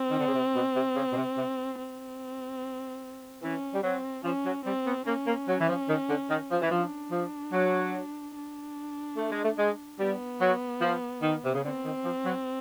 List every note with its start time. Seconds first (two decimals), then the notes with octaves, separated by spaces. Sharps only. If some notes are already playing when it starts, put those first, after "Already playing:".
Already playing: C4
0.11 D#3
0.19 D3
0.27 C#3
0.35 C3
0.55 B2
0.76 C3
0.96 C#3
1.13 B2
1.17 C3
1.38 C3
1.79 C4
3.43 E3 C#4
3.74 G3
3.84 F#3 C4
4.25 F3 C#4
4.45 F#3
4.65 G3 C4
4.86 B3
5.07 A#3 C#4
5.27 A#3
5.49 F#3
5.61 E3
5.69 F3
5.89 D#3
6.10 D3
6.30 D#3
6.51 F3
6.62 E3
6.71 F3 D4
7.12 F3
7.53 F#3
8.35 D4
9.17 A3
9.31 G#3
9.45 A3
9.59 G#3
10.00 G3 B3
10.41 F#3
10.81 F3
11.22 D#3
11.45 C3
11.55 C#3
11.64 D3 C4
11.85 D#3
12.05 F3
12.26 F#3